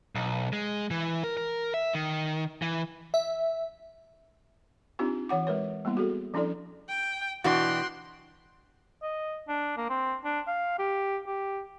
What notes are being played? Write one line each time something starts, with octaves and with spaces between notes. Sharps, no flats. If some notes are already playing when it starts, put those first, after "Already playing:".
B1
G#3
E3
A#4
A#4
E5
D#3
E3
E5
C4 D4 D#4 F4 G4
E3 C#5 F#5 D6
G#3 A#4 B4 C#5
G3 A#3 B3 E4
F#4 G#4 A4
F3 C#4 D4 E4 A4 D5
G5
B2 E3 D4 F#4 G5 C6 F#6
D#5
D4
A#3
C4
D4
F5
G4
G4